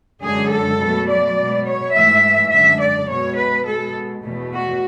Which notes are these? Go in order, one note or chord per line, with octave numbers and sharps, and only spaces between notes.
F#2 D3 G#3 G#4
A4
B2 F#3 A3
D5
B2 G#3
C#5
G#2 E3 A3 E5
F#2 D3 G#3 E5
D5
B2 G#3 C#5
B4
B2 G#3 A4
E2 B2 A3
F#4